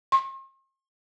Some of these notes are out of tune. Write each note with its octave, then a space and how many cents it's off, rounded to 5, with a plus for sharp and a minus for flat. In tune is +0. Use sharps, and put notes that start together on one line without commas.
C6 +45